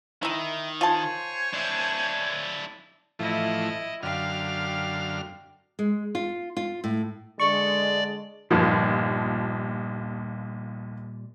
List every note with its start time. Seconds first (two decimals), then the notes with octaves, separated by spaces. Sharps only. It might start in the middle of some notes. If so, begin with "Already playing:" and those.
0.23 D#3 D#4 E4
0.81 F4 C5 C#5 G#5 A5
1.53 D4 E4
3.19 A2 E3 F3 E4 D#5
4.03 F#2 D3 G4 F5 F6
5.79 G#3
6.15 F4
6.57 F4
6.84 A2
7.40 D3 G#3 D5 C#6
8.50 G1 D#2 A#2 F3 G3